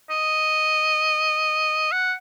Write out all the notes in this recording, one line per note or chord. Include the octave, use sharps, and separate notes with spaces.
D#5
F#5